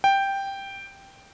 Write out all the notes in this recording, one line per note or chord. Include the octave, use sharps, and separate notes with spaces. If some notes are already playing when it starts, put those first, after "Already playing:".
G5